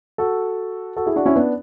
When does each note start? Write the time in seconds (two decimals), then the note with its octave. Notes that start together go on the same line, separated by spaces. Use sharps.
0.18 F#4 A4
0.97 F#4 A4
1.06 E4 G#4
1.16 D4 F#4
1.26 C#4 E4
1.36 B3 D4